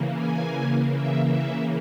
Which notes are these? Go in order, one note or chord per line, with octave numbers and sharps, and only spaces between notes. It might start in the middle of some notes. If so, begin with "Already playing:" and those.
Already playing: C#3 E3 A#3
G#5
E5
E5